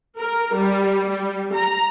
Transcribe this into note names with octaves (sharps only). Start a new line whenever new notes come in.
A#4
G3
G3
A#5